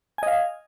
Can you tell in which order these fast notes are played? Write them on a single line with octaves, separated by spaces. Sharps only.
G#5 D#5 F5